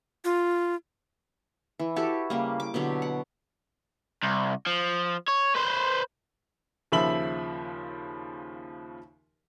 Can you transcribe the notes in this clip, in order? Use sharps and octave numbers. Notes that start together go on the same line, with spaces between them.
F4
E3
E4 F#4 G4 A4
C#3 G3 A#3
D6
B2 D3 F#3 G4
F#5
C2
F3
C#5
B4 C5
D#2 C#3 F3 E5 B5 F#7